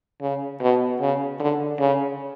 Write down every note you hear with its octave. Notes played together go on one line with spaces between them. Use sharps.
C#3
B2
C#3
D3
C#3